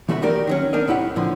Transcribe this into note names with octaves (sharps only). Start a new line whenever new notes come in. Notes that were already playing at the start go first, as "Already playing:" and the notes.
E3 A3 F#4 E5 B5
D#4 F#4 G4 A#4 D5
D#3 F#3 C#4
C4 D4 A#4 D#5
C2 A2 E4 G4 F#5
A2 D3 F3